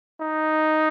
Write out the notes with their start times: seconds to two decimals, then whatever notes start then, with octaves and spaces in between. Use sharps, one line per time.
0.21 D#4